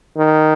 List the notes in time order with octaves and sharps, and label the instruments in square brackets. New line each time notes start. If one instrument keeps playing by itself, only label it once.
[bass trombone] D#3